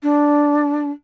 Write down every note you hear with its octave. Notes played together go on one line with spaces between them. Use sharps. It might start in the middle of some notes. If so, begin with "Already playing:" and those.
D4